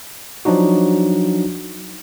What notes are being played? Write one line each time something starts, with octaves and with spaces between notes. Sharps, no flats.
F3 F#3 D4 D#4 F#4